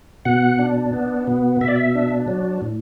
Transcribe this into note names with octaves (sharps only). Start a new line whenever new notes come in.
B2 F#5
D4
B3
B2
B2 E5
D5
E5
D4
F#3
A2